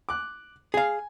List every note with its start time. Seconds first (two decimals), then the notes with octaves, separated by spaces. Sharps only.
0.09 D6 F#6
0.74 G#4 F5 G#5